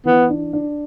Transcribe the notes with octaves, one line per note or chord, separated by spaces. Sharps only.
E3 B3
D4
D4